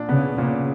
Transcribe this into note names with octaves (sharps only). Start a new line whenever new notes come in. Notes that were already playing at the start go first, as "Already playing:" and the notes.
Already playing: A#2 D4
C#3 B3
A#2 C#3